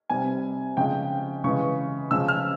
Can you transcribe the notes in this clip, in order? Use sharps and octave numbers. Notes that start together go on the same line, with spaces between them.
C3 G3 G#5
C#3 F3 G#3 G5
C#3 E3 G#3 C#6
C#3 F3 G#3 E6
F6